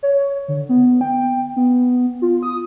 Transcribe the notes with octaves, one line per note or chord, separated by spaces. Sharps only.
C#5
D3
B3
G5
B3
F4
D#6